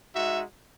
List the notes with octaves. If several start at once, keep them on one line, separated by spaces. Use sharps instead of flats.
G#3 D#4 F#4 E5